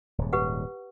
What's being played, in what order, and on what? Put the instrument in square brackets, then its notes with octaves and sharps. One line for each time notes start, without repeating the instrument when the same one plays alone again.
[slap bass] D#1 G#2
[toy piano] G4 B4 F#5